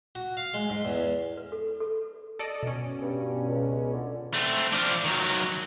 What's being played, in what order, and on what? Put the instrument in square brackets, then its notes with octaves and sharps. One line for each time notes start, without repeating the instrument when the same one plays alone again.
[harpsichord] F#4
F5
G#3
G#2
E2
[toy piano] B4
A4
A4
[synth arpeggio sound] A4 D5 D#5
B2 C#4
[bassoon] G2
C#2
D3
[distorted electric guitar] A3 C4
F3 D4
D#3 F#3